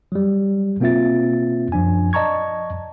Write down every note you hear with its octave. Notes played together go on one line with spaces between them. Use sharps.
F#3 G3
B2 A#3 C4 F4 E5 A6
F#2 F3 D4 G#5
D5 D#5 A5 A#5 C#6 G#6